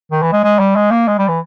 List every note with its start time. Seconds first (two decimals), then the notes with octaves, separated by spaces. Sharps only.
0.12 D#3
0.22 E3
0.33 G#3
0.44 G#3
0.59 G3
0.76 G#3
0.91 A#3
1.08 G#3
1.18 G3
1.28 E3